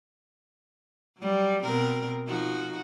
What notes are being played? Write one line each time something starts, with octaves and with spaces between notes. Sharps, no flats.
F#3 G3
B2 C4 A#4
F3 D#4 F#4